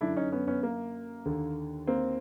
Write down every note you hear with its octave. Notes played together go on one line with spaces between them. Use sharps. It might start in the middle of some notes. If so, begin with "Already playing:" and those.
F#2 D3 D4 E4
C#4 D#4
B3 C#4
B3 C#4
A#3
D#2 D3
A#3 C4